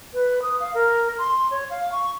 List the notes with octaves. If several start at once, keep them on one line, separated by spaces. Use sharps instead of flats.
B4
D#6
F5
A#4
C6
C#5
F5
C#6